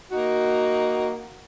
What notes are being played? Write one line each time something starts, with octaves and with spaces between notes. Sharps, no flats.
A#3 D#4 F#4